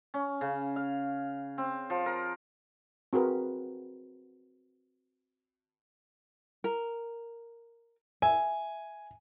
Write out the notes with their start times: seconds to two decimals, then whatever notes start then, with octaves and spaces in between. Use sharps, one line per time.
0.14 C#4
0.41 C#3
0.76 F5
1.58 C4
1.90 F3
2.06 A#4
3.13 C4 F#4 G#4 A#4 B4
6.64 A#4
8.22 E5 G#5